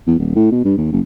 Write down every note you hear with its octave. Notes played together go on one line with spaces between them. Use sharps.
E2
D#1
A2
B2
G2
D#2
F#1